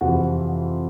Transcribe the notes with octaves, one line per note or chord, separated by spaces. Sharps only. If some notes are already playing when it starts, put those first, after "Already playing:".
F2 C3 E3 F#4